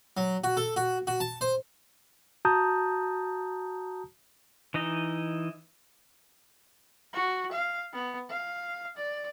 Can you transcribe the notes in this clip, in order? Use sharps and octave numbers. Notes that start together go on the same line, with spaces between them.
F#3
F#4
A4
F#4
F#4
A5
C5
F#4 A5 A#5 D#6 G6
E3 D#4 D#5
F#4
F5
B3
F5
D5